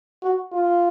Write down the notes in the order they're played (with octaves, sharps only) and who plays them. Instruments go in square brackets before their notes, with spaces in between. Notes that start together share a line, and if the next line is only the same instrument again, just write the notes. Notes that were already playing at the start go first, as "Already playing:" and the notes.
[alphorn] F#4
F4